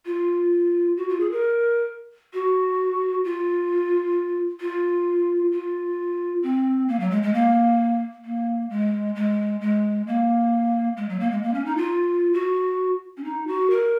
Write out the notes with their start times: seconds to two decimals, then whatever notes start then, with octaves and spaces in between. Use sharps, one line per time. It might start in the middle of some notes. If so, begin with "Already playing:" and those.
0.06 F4
0.97 F#4
1.09 F4
1.20 G#4
1.31 A#4
2.34 F#4
3.24 F4
4.60 F4
5.52 F4
6.43 C4
6.89 A#3
7.00 F#3
7.11 G#3
7.23 G#3
7.34 A#3
8.25 A#3
8.70 G#3
9.15 G#3
9.61 G#3
10.07 A#3
10.97 G#3
11.09 F#3
11.20 A#3
11.31 G#3
11.43 A#3
11.54 C#4
11.65 D#4
11.77 F4
12.34 F#4
13.17 C#4
13.24 D#4
13.47 F#4
13.70 A#4